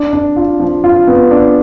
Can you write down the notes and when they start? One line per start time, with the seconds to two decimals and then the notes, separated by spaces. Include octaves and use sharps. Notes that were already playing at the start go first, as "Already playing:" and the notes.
Already playing: D4
0.13 D4
0.36 F4
0.60 F3
0.84 F4
1.08 B3
1.31 D4